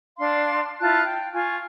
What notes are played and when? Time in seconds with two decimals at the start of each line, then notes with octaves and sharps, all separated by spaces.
0.18 D4 F5 C6
0.80 E4 F4 A5 F#6
1.04 G5
1.33 F4 G#5 C#6